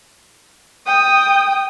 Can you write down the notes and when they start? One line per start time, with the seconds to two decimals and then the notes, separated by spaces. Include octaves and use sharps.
0.87 G5 D#6